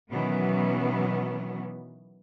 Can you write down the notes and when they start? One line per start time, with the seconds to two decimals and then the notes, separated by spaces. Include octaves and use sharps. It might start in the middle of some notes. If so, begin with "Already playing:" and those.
0.10 B2 D#3 E3 F#3 B3 C#4